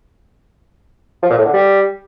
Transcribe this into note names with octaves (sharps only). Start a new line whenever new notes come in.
F3
A#2
A2
D3
G3